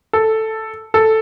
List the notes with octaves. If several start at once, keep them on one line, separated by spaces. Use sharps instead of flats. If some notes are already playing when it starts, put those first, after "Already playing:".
A4
A4